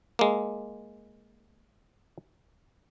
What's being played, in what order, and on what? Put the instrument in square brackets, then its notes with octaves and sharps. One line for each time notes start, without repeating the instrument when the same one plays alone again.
[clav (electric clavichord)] G#3 A#3